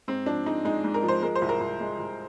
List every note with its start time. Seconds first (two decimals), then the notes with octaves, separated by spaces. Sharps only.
0.08 G#2 C4
0.26 F3 D4
0.46 G#3 D#4
0.65 G#3 D#4
0.84 G#2
0.94 A#4
1.03 F3
1.08 C5
1.23 G#3 A#4
1.35 C5
1.42 C2
1.49 A#4
1.61 C2
1.80 G#3
1.99 C2